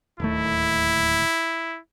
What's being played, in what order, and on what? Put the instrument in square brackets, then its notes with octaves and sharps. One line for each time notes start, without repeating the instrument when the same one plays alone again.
[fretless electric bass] D1 D#2 A3 [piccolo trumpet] E4